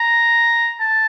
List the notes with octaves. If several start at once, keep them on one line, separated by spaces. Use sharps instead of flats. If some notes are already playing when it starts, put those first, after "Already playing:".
Already playing: A#5
A5